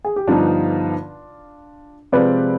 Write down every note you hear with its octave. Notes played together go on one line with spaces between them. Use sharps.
G#4
G4
G2 D3 F3 B3 D4 D#4 F4
C3 F3 G#3 C4 F4 B4 D5